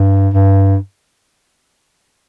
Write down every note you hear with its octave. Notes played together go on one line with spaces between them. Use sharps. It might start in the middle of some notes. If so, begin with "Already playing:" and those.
Already playing: G2
G2